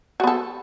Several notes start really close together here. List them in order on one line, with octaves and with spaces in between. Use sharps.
F#4 B3 A4